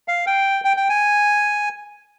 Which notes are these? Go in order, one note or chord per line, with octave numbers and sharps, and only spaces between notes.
F5
G5
G5
G5
G#5